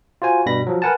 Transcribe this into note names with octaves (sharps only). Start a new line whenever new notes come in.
F4 F#4 C5 G#5
G2 B2 G3 B5 A#6
F3 F#3
A#4 B4 F#5 G#5 A5